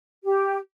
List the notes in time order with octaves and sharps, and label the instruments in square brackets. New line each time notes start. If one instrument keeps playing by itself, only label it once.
[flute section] G4